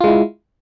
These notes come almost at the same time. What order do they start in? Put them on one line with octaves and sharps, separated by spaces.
F4 G#3 E4